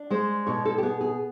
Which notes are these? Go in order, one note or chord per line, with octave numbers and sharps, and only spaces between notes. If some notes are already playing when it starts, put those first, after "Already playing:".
Already playing: D4
G#3 C5
B2 C#5
A4
G4
B3 G#4
G#4